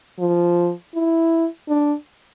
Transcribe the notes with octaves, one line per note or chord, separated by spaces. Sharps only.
F3
E4
D4